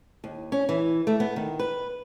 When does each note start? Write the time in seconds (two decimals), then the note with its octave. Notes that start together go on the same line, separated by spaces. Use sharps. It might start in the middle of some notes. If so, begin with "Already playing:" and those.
0.24 D#2
0.52 C#4
0.69 E3
1.07 A3
1.20 B3
1.36 D#3
1.59 B4